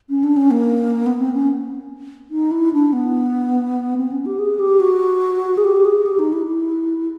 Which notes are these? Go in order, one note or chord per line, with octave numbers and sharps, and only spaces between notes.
C#4
D4
C#4
A#3
B3
C4
C#4
D#4
E4
D4
B3
C4
C#4
G4
G#4
G4
F#4
G#4
G4
G#4
G4
D#4
E4
E4